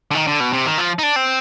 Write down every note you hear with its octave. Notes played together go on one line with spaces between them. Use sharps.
D3
D#3
D3
B2
C3
D#3
F3
D#4
D4
C4